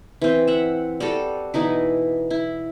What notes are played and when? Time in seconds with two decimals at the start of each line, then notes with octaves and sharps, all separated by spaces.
0.22 E3 C4
0.47 E5 F#5
1.00 G3 F#4 A4
1.54 B2 E3 D#4 E4
2.30 E4